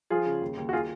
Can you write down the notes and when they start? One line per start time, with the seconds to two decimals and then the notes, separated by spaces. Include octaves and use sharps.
0.10 F3 F4 G#4
0.26 C#3
0.42 D#2
0.58 D#2
0.69 F#4
0.73 F4 G#4